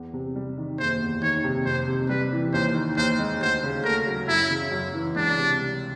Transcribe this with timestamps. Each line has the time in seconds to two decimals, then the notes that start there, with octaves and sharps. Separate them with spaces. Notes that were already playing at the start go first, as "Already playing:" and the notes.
Already playing: E2
0.14 C3
0.35 G3
0.57 D#3
0.79 F#1 C5
1.01 E2
1.22 D#3 C#5
1.44 C3
1.65 F2 C5
1.88 C3
2.09 G3 B4
2.32 E3
2.53 D#2 C5
2.75 D#3
2.97 D#2 C5
3.19 G#3
3.41 D2 C5
3.63 C#3
3.84 A3 A#4
4.07 F#3
4.28 F#2 E4
4.50 C#3
4.72 F#2
4.94 E3
5.15 C#2 D4
5.38 C3
5.60 G3